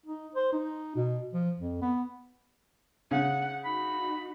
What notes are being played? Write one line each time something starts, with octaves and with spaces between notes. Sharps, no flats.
D#4
C5
D#4
B2
F3
F2
B3
C#3 F#5
D#4 F#4 B5